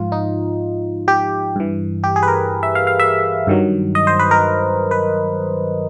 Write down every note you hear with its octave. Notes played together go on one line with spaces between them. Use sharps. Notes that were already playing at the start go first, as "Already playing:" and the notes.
Already playing: G#2 F3 F4
D#4
G4
G2 E3
G4
G#4
B4
A#4
E5
F5
F5
E5
G2 D#3 F#3
D#5
C5
B4
A#4
B4